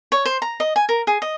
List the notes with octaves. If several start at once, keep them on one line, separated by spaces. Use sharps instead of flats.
C#5
C5
A#5
D#5
G#5
A#4
G#4
D#5